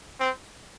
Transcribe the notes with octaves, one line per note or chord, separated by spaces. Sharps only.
C4